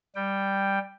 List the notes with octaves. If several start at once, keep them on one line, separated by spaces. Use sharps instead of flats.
G3 G5